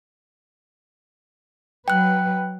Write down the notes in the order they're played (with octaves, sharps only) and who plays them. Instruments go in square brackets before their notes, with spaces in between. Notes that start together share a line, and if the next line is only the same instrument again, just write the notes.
[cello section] F#3 B4 [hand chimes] G5 F#6